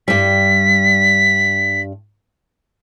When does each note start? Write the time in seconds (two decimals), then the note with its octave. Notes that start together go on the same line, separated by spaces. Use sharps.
0.08 G2 G3 B6